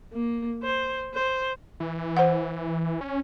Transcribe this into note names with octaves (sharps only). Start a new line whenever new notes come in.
A#3
C5
C5
E3
C5 F#5
C#4